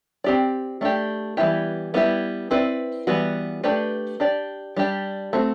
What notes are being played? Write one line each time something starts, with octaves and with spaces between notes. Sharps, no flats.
C4 G4 D5
A3 D4 G4
E3 G3 B3 E4 G4
G3 B3 E4 G4
C4 E4 B4 D5
E3 G3 B3 F#4
A3 D4 G4 B4 D5
D4 G4 D5
G3 D4 G4
A3 C4 F#4